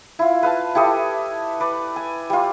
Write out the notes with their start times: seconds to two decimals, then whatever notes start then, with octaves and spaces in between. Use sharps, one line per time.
0.19 E4 F4
0.43 B4 F5 A5
0.75 E4 G4 A4 D#5
1.60 B4 D5
1.96 G#5
2.30 G3 F4